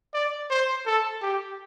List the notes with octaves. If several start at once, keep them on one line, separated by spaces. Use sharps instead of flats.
D5
C5
A4
G4